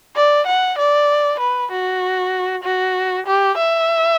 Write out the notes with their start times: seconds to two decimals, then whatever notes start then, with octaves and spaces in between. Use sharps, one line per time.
0.16 D5
0.47 F#5
0.78 D5
1.40 B4
1.72 F#4
2.64 F#4
3.27 G4
3.57 E5